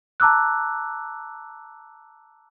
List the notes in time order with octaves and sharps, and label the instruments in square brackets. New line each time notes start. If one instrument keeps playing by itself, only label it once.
[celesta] A5 A#5 D6 E6 F#6